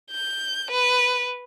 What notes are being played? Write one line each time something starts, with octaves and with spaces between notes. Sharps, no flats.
G6
B4